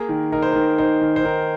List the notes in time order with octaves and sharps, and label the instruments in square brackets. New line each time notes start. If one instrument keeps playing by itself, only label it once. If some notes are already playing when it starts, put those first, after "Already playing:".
Already playing: [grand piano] A#3 G#4
D#3
D#4 A#4
C5
D#3 A#4
D#4 C5
D#3
C5
D#3 A#4